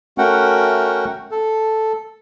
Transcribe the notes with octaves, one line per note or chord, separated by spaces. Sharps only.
A3 C#4 F#4 A#4 F#5 G5
A4